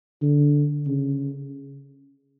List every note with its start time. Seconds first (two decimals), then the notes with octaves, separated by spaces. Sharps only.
0.22 D3
0.87 C#3